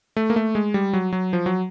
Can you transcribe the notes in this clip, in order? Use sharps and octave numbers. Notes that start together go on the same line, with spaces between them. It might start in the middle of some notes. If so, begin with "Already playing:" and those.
A3
A#3
A3
G#3
G3
F#3
F#3
F3
F#3